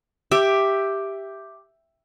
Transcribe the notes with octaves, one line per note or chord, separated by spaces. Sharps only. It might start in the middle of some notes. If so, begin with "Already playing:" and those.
G4 E5